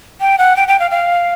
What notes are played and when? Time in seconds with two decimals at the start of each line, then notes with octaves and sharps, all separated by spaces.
0.20 G5
0.38 F#5
0.56 G5
0.68 G5
0.79 F5
0.91 F5